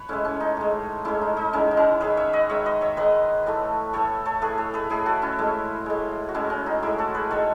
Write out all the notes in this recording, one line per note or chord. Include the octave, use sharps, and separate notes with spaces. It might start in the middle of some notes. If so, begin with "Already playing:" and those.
Already playing: B4 C#5
A2 G#3 C#4 E4
C#4
D#4
A2 G#3
A2 G#3 C#4 E4
D#4
D#4
D#3 G#3 C#4 E4
D#4
C#4 E4
D#3 G#3 G#4 B4
C#5 E5
B4 D#5
D#3 G#3 C#5 E5
B4 D#5
C#5 E5
D#3 G#3 B4 D#5
A2 E3 A3
A2 E3 A3 A4 C#5
A4 C#5
A2 E3 A3 G#4 B4
A4 C#5
G#4 B4
A2 E3 A3 E4 G#4
F#4 A4
C#4 E4
A2 G#3
A2 G#3
F#4
A2 G#3 C#4 E4
C#4
D#4 F#4
A2 G#3 E4 G#4
F#4 A4
G#4 B4
D#3 G#3 A4 C#5